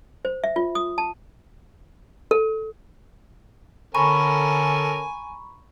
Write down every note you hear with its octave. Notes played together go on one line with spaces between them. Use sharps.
C5
E5
F4
D#6
A5
A4
D3 C#4 A4 A#4 G#5 A#5 B5 C#6